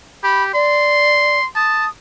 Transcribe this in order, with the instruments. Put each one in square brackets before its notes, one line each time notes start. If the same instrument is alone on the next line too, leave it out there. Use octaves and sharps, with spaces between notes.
[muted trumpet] G4 [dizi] B5
[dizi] D5 [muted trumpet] C6
[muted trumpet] A5 [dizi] D#6